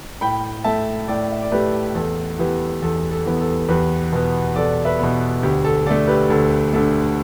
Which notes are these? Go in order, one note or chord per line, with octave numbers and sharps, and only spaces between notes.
A2 G5 B5
A3 E5 A5
A2 A4 D5
E5
D5
A3 G4 B4
E2 A4
E3 B3 G4
E2 A4
A4
E3 B3
A4
E2 G4 B4
B2 B3
E2 A4 D5
B4 E5
B2 B3
D2 G4
A4
D3 A3 A4 D5
G4 B4
D2 A4
D3 A3 A4